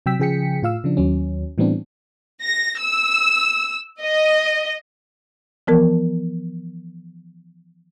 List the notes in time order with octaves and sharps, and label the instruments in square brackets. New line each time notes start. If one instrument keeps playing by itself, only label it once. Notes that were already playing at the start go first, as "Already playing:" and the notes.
[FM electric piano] C3 F#3 G5 E6 B6
C#3 F3 G#4 G5 B6 C#7
A2 F4 F5 E6
C#3 F3 D4
D#2 F#3 C#4
A2 E3 G3 B3 C4 D4
[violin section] A#6
E6
D#5
[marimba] E3 F3 B3 A#4